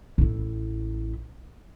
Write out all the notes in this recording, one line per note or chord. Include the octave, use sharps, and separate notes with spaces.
A1 E4